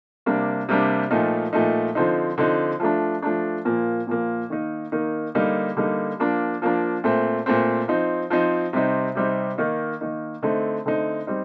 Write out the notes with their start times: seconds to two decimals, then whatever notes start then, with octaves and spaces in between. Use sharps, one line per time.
0.26 C3 G3 A#3 D4
0.69 C3 G3 A#3 D4
1.11 A#2 F3 A3 D#4
1.53 A#2 F3 A3 D#4
1.95 D3 F3 C4 D#4
2.38 D3 F3 C4 D#4
2.80 F3 A3 D4
3.22 F3 A3 D4
3.65 A#2 F3 A#3
4.07 A#2 F3 A#3
4.50 D#3 A#3 D#4
4.92 D#3 A#3 D#4
5.35 D3 G3 A#3 D#4
5.77 D3 G3 A#3 D#4
6.20 F3 A#3 D4
6.62 F3 A#3 D4
7.04 A#2 A3 C4
7.46 A#2 A3 C4
7.88 F3 C4 D#4
8.30 F3 C4 D#4
8.73 C3 G3 C4 D#4
9.15 C3 G3 C4 D#4
9.58 D#3 A#3 D#4
10.01 D#3 A#3 D#4
10.43 D3 A3 C4 D#4
10.86 D3 A3 C4 D#4
11.27 G3 C4 D#4